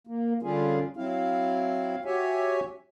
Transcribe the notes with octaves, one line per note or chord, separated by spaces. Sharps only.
A#3
D3 G3 C#4 F4 G#4
F#3 C4 E4 F5
F#4 G4 C#5 E5 G#5